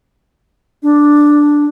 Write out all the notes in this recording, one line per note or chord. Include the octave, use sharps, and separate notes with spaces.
D4